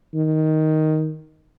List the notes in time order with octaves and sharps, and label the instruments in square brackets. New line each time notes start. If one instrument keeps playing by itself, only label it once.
[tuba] D#3